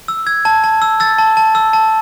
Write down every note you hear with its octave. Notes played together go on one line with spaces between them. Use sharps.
E6
E6 G#6
A5
A5
E6
E6 A6
A5
A5
E6
A5